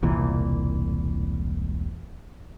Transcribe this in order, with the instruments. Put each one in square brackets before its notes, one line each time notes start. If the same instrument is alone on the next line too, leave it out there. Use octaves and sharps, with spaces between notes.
[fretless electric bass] E1 C2 A#2 E3